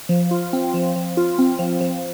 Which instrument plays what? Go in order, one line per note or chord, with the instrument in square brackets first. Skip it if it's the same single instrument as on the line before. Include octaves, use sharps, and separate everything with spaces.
[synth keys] F3
F4
C4
F3
F3
F4
C4
F3
F3